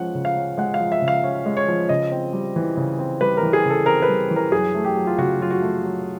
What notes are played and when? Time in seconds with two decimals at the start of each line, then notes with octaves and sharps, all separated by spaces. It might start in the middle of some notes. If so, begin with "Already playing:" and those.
Already playing: F3 G#3 C#4 F#5
0.15 C#3
0.25 F5
0.37 C#4
0.58 G#3 F#5
0.74 F5
0.80 F3
0.92 E5
1.02 C#3
1.08 F5
1.24 C#4
1.46 G#3
1.57 C#5
1.68 F3
1.89 C#3 D#5
2.12 C4
2.33 G3
2.56 E3
2.77 C#3
2.99 C4
3.21 G3 B4
3.37 A#4
3.43 E3
3.53 G#4
3.65 C#3 A4
3.86 C4 A#4
4.02 B4
4.08 G3
4.31 E3
4.36 A#4
4.52 F#2 G#4
4.75 A3
4.85 G4
4.96 F#3
5.07 F4
5.18 C#3 F#4
5.40 F#2 F4
5.51 F#4
5.61 A3
5.84 F#3